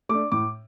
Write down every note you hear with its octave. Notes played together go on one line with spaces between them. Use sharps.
A3 D4 D6
A2 D6